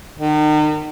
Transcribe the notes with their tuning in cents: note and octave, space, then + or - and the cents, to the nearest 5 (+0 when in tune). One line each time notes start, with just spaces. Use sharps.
D#3 -40